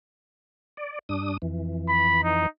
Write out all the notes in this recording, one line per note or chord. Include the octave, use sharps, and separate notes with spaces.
D5
G2 D4 D#6
F2 E3
B5
D#4